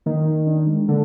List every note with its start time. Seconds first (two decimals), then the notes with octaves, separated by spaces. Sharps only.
0.06 D#3 A#3
0.47 D4
0.67 G#3
0.88 D3 A#3